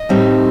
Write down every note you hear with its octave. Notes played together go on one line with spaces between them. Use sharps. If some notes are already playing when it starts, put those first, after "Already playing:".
Already playing: D#5
A2 G3 C4 D#4